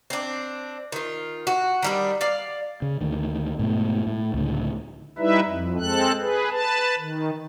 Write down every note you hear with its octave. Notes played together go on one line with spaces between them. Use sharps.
C4 D4
D#3 F4
F#4
D#3 G3 D4
D5 F5
C#3
D2 D#3
G#2 B2 A3
A2
C#2 A2 D3
G3 D#4 E4 B4 E5
F2
G#3 C4 A4 F#6
G#4 B4
B4 A5
D#3